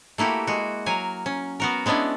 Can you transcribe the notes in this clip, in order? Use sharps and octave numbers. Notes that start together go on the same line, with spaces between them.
A3 A#3 E4 F#4 G4
G#3 F#4
F#3 A#4 G#5
C#4
B3 F#4 A#4
G#3 B3 C#4 D4 E4